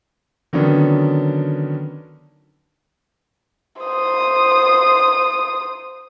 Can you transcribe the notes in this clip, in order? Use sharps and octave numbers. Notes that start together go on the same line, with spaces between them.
D3 D#3 F#3 B3 C#4 D4
C5 D#6